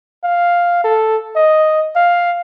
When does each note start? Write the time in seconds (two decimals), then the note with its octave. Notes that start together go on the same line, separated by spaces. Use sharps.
0.24 F5
0.84 A4
1.36 D#5
1.96 F5